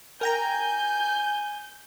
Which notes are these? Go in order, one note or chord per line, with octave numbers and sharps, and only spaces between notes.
A#4 G5 G#5 A#5 G6